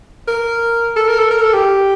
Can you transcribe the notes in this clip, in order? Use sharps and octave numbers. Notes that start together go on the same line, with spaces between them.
A#4
A4
A#4
A4
A#4
A4
G4